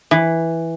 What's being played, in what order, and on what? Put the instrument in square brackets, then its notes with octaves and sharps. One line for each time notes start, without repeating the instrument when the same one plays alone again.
[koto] E3